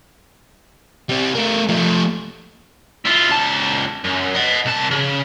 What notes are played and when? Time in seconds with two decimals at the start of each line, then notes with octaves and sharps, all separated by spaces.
1.10 G3 C4
1.35 A3 A#4
1.69 F3 A3
3.05 E4 F4
3.30 C#2 A5
4.04 F#2
4.34 D#5 F#5
4.65 C2 A5
4.91 C#3